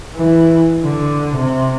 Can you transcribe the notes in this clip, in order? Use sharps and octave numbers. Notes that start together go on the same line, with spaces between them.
E3
D3
C3